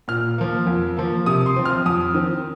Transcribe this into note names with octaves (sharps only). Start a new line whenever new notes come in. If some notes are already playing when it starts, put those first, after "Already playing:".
A#2 F6
F3 A#3
F2
F3 A#3
C3 D#6
C6
F3 C4
F6
F2 D#6
D#3 C4